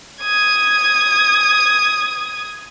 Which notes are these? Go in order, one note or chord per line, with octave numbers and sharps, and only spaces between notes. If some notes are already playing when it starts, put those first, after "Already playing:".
D#6 G#6